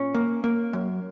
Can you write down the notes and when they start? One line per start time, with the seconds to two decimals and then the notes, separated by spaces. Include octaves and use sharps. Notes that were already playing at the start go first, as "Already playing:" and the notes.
Already playing: A#2 C#4
0.14 A#3
0.44 A#3
0.73 F#2